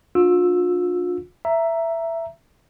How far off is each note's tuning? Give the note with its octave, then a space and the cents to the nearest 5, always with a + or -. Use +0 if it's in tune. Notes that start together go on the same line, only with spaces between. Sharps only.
D4 +0 F4 +35 E6 +0
E5 +10 A#5 +0